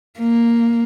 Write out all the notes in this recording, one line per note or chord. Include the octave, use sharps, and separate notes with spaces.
A#3